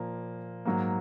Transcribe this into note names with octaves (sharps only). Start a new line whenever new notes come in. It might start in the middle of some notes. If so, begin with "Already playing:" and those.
Already playing: A#2 F3 A#3
G#2 F#3 A#3